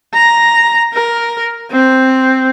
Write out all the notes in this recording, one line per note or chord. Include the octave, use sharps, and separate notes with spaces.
A#5
A#4
C4